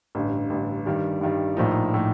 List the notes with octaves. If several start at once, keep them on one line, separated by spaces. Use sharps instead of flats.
A1 G2 D3
A1 G2 D3
G2 D#3 G3
G2 D#3 G3
A#1 A2 F3 A#3 D#4
A2 F3 A#3 D#4